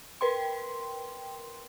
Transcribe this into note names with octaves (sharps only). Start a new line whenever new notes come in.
A#4 B4 G5 C6